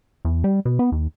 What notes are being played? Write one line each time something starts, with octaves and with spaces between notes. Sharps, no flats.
E2
G3
B2
B3
D#2